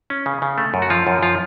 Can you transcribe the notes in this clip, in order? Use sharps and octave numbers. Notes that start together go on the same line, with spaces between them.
C#4
C#3
C#3
A3
F#2
F#4
F3 F4
F#2
F3 F4